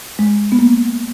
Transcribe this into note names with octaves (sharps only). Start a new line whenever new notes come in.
G#3
B3
A#3